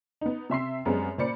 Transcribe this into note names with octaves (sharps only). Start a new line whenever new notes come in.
B3 D#4
C3 E5 C6 C7
F#2 G3 G#3 B3 C4
A#2 A#3 C5 D5 B5 C#7